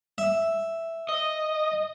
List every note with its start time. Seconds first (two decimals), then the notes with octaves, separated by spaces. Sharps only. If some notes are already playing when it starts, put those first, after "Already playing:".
0.18 E5
1.09 D#5